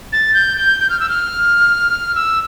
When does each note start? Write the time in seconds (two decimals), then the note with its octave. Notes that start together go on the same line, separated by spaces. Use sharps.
0.13 A6
0.34 G6
0.57 G6
0.80 G6
0.90 F6
1.00 E6
1.09 F6
2.15 E6